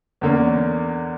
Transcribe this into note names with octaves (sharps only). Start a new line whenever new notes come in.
E2 D3 A#3 C#4